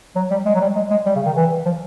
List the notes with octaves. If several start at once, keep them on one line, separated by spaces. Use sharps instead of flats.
F#3
G3
G#3
F#3
G3
G#3
G#3
G3
C#3
D#3
E3
F3